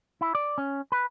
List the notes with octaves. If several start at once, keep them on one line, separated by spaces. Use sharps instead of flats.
E4
D5
C#4
B4